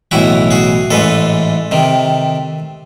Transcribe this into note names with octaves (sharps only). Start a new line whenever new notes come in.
B1 A2 E3 E4 F#4
F#4 G#4
A1 G#2 E3 A4 B4
C3 D#3